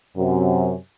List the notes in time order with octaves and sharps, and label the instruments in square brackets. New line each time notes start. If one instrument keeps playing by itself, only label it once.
[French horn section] F#2 C3